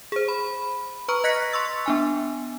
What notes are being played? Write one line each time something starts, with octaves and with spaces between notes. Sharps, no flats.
G#4 C5
B5
B4 A#5 C#6 F6
D#5 F#6 A#6 B6 C#7
C6 C#6 E6 A6
B3 D4 G#5